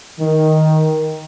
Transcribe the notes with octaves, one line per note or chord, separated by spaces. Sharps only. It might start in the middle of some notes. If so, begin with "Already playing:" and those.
D#3